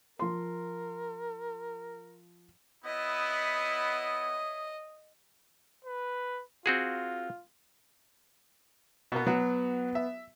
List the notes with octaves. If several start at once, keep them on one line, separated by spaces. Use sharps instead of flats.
F3 A#4 C6
B3 E4 C#5 D#5 E5 D#6
B4
C4 F4 F#4 G#4
B2 A#3 B3
F#3 B3 F#4
E5